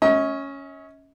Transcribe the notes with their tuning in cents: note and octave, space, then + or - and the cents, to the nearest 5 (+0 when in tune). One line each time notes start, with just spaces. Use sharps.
C#4 +0 D#5 +45